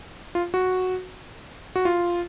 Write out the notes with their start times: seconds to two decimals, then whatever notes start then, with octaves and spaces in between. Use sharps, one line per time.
0.35 F4
0.54 F#4
1.76 F#4
1.85 F4